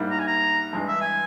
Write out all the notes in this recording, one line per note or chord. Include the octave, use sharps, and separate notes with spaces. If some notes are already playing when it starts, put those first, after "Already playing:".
Already playing: G#2 G3 A#3 E4
A#5
G#5
A#5
G2 E3 G#3
E5
G#5